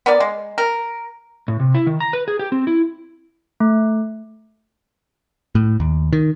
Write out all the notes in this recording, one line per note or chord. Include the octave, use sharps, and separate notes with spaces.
B3 A#4 D5
G#3
A#4
A2
C3
E4
D#3
A#5
B4
G#4
G4
C4
E4
A3
A2
D#2
D#3